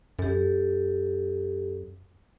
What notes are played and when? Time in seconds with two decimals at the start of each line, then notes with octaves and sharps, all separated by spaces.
0.19 F#2 G4 A4